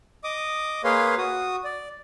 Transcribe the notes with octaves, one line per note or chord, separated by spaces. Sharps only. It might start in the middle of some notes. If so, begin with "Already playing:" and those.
D#5 D6 D#6
A#3 G#4 B4 C#5 F5 C6
F#4 D#6
D5